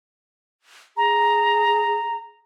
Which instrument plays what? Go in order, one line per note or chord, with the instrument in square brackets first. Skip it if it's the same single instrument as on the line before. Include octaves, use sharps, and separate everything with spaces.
[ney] G#4 [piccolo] A#5